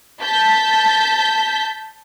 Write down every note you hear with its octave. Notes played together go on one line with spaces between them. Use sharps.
A5 G6 B6